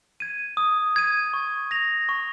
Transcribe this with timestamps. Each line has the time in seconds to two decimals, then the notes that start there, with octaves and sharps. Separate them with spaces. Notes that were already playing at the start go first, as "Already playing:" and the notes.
0.20 G#6 D#7
0.57 D#6
0.96 G#6 D#7
1.33 C#6
1.71 A#6 F7
2.09 C#6